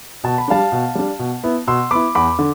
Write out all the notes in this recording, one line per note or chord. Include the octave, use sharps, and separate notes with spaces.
B2 A5
B5
G3 D4 F5 A5
B2
G3 D4
B2
B3 E4
B2 C6 E6
B3 E4 B5 D6
E2 B5 D6
D3